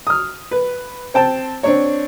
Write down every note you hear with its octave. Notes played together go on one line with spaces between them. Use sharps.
D#6 F6
B4
C4 G5 A5
C4 D4 C#5